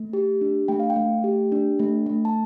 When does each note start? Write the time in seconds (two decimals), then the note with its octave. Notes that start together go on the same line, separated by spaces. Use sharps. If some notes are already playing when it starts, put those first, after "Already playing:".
Already playing: A3
0.13 G4
0.41 D4
0.68 A3 G5
0.80 F5
0.90 G5
0.96 A3
1.24 G4
1.52 D4
1.79 A3
2.06 A3
2.25 A5